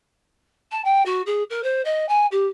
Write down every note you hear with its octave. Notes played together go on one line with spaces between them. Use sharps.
A5
G5
F#4
G#4
A#4
C5
D#5
G#5
G4